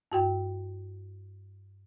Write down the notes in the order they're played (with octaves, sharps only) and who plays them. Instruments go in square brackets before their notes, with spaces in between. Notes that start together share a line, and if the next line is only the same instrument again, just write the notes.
[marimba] G2 F#4 G5